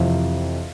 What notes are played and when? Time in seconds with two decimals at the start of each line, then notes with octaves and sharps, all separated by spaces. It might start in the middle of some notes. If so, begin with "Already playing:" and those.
Already playing: F2 C3 E3 F4